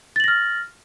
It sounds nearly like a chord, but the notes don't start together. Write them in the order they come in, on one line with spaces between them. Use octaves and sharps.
A6 F#7 A#6 F6